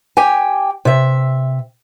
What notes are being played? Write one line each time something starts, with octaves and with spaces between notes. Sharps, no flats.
G4 G5 G#5
C3 E5